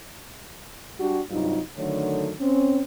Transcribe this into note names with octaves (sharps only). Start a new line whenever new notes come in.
G3 D4 F#4 G4
G2 C3 F#3 D#4 F4
D3 D#3 F#3 A3 C#5
C4 C#4